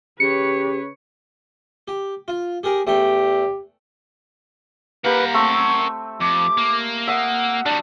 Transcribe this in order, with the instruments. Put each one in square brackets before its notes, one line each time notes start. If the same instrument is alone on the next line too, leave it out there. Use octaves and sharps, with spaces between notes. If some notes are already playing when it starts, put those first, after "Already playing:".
[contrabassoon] C#3 [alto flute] G4 [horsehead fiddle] B4 C#5 [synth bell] C#7
[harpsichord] G4
F4
G4 G#4 A#4
[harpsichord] E2 A3 G5 [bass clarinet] G4
[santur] A#3 G4 [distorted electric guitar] A#4 F#5 [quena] B4
[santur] A3 C4 E6 [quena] C#6
[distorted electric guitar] F2 [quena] D6
[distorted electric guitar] A#3
[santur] E5 D#6 [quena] F#5
[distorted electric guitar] G3 F#4 [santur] D4